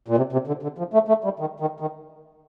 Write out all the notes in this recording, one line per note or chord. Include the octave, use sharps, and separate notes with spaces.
A#2
C3
C3
D3
D3
F3
A3
A3
G3
D#3
D#3
D#3